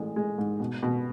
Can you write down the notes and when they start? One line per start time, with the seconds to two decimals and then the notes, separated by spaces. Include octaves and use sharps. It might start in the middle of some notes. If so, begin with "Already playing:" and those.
Already playing: A1 G#3
0.16 G#3
0.38 G#2
0.60 B2
0.83 B2